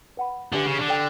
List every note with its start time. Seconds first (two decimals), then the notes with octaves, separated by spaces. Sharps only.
0.17 B4 F#5 B5
0.53 D3 D4 G4 B4 E5
0.66 C#3
0.79 D3
0.89 A4 D5 G5